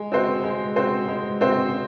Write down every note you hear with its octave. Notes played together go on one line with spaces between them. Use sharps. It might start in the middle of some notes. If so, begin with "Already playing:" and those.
Already playing: G#3
C4 F#4 C5
G#3
C4 F#4 C5
G#3
C4 F#4 C5